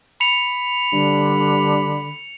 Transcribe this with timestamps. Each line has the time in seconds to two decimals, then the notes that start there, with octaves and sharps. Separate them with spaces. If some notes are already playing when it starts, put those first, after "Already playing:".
0.21 B5 C#7 F7
0.93 G2 D3